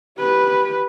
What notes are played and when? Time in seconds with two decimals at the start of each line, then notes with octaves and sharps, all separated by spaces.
0.18 G4 B4